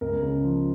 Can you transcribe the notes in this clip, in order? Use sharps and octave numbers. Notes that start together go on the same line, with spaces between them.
C#2 A#4
C#3
F3